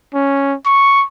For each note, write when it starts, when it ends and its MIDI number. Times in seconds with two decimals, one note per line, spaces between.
0.14 0.54 61
0.66 1.05 85